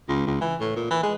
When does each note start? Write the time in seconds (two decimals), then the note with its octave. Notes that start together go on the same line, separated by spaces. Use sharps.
0.09 C#2
0.27 C#2
0.41 E3
0.60 A2
0.76 A#2
0.90 E3
1.03 G#3